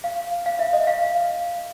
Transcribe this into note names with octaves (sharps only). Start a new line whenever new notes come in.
F5
F5
E5
D#5
F5